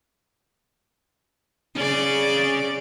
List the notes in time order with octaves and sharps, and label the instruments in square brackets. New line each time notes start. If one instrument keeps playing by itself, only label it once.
[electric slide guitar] C#4 G#4 [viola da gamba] D5